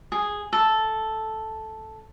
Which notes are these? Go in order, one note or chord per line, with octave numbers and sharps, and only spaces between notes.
G#4
A4